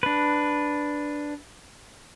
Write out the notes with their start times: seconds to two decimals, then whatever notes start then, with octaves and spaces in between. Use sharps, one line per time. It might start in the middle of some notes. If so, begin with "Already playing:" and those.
0.03 D4 B4